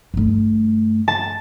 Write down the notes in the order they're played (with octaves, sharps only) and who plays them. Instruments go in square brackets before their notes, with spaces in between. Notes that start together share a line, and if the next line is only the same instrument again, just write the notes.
[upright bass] G2 A3
[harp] A5